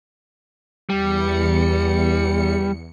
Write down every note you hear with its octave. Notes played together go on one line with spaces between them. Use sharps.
E2 G3 C#7